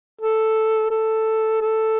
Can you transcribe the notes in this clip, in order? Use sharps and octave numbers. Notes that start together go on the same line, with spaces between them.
A4
A4
A4